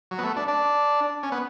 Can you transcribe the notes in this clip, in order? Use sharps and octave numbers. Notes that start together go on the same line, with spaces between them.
F#3
B3
A3
D4
D4
C#4
B3